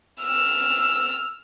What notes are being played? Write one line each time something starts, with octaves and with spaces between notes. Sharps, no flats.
E6 F6